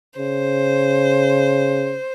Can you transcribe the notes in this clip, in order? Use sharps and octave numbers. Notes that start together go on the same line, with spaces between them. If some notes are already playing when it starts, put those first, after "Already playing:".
C#3 C5